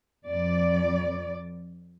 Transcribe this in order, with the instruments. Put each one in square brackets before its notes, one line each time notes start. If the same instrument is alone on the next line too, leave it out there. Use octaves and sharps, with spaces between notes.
[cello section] F2 D5